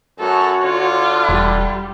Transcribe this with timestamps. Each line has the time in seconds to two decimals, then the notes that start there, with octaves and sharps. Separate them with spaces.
0.20 F#2 F#4 A4 C#5
0.64 D3 F4
1.29 E1 G3